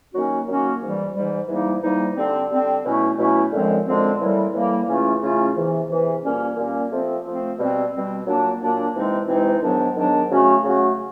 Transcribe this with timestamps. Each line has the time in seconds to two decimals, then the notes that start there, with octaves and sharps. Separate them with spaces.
0.13 D#3 F#3 A#3 C#4 F#4
0.47 D#3 F#3 A#3 C#4 F#4
0.81 G#2 E3 G3
1.15 G#2 E3 G3
1.49 G#2 E3 G3 A#3 D#4
1.82 G#2 E3 G3 A#3 D#4
2.16 D3 G3 C4
2.51 D3 G3 C4
2.84 B2 F#3 A3 C#4 E4
3.18 B2 F#3 A3 C#4 E4
3.52 F#2 D3 F3 G#3 C4
3.86 F#2 D3 F3 G#3 C4
4.20 A2 E3 G3 A#3
4.54 A2 E3 G3 A#3
4.87 C#3 E3 A3 C#4 F4
5.21 C#3 E3 A3 C#4 F4
5.56 E2 C3 E3
5.89 E2 C3 E3
6.23 A#2 G3 A#3 C#4
6.57 A#2 G3 A#3 C#4
6.91 F3 A3 C4
7.25 F3 A3 C4
7.58 B2 G3 C4
7.93 B2 G3 C4
8.27 A#2 F#3 A#3 D4
8.61 A#2 F#3 A#3 D4
8.94 C3 E3 G#3 C4 D#4
9.28 C3 E3 G#3 C4 D#4
9.62 G#2 D#3 F#3 B3 D4
9.96 G#2 D#3 F#3 B3 D4
10.30 C#3 F#3 A3 C#4 F#4
10.64 C#3 F#3 A3 C#4 F#4